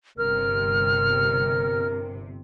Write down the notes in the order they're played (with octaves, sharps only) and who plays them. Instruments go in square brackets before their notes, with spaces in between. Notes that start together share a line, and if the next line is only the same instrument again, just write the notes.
[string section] G1 C3 [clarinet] A#4 [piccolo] F6